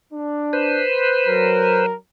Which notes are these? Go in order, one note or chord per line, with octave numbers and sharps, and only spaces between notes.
D4
B4 C5
F#3 A#4